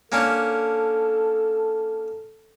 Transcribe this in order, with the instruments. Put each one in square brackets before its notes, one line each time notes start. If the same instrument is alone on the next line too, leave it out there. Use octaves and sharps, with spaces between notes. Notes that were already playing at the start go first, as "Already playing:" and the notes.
[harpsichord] A#3 C#4 D4 [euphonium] A4